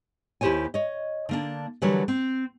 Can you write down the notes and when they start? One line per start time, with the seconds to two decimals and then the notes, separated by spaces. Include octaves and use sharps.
0.41 D#2 E4 G4 C5 C#5 G#5
0.74 C#5 D#5
1.29 D3 A#3 D4
1.82 D3 E3 F#3 G3 A#4 C#5
2.08 C4